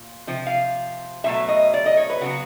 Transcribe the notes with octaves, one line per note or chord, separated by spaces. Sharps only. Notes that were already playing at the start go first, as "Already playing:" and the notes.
Already playing: A#2
C3 F3
F5
B2 F#3 A3 E5
D#5
D5
D#5
C#5
B4
C#3 F#3 B3 F#4